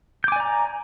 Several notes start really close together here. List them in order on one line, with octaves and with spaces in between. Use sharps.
G6 D6 G#5 D5 A#5